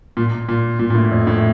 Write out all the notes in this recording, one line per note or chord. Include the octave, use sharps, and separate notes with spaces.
A#2
A#2
A#2
A#2
A2
F2
A2